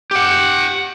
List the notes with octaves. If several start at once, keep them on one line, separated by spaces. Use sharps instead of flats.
G4 F#5